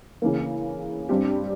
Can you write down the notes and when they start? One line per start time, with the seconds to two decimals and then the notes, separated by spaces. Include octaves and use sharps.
0.22 C#3 E3 A#3
1.09 G2 G3 C4 G4